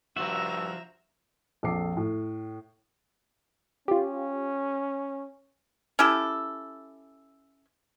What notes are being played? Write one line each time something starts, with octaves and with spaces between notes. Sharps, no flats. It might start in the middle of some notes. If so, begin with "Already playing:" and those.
G2 F3 F4 F#4 E5 A#5 E6
A#1 F2 F3 A4 D6 C7
A2
C#4 F4 G4
C#4 E4 G4 A4